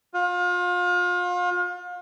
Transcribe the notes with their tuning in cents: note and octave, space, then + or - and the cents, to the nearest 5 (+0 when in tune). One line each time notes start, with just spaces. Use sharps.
F4 +35